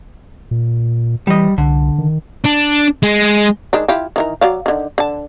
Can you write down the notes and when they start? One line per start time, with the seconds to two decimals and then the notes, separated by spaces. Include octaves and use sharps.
0.51 A#2
1.27 E3 G3 D#5
1.58 C2 D3
1.98 D#3
2.44 D4
3.03 G#3
3.73 D#3 G#3 D4
3.88 E4 F4 G4
4.16 D#3 E3 A#4
4.41 F#3 D5 F5
4.66 D3 D#3
4.98 D3 A5